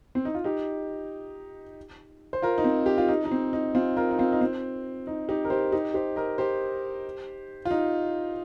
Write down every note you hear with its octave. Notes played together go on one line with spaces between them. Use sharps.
C4
D#4
F4
D#4 G4
C5
F4 A#4
D#4
C4
G4
F4
D#4
D#4
C4
D#4
C4 F4
F4 A#4
D#4
C4 F4
D#4
C4
D#4
D#4 G4
A#4
G4 C5
D#4 G4
G4 C5
A#4 D#5
G4 C5
F4
D#4